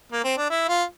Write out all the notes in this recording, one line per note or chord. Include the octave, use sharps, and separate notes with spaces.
A#3
C4
D4
E4
F4